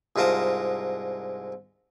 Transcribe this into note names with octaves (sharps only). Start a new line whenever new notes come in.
C2 G#2 F4 A#4 A5 D#6